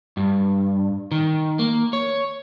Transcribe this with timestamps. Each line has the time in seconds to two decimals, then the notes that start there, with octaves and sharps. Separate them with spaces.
0.17 G2
1.12 D#3
1.59 A#3
1.93 C#5